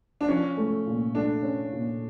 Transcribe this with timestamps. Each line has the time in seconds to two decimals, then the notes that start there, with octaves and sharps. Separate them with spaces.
0.21 D4
0.28 F3 C#4
0.57 A3
0.86 A#2
1.15 A3 D4
1.43 C#4
1.72 A#2